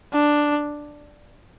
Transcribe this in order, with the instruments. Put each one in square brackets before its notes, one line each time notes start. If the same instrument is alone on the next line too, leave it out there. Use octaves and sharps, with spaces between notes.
[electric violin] D4